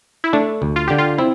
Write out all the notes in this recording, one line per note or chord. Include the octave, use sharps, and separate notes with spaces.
E4
A3 D4
D2
F4
D3 G4
F4
C4 E4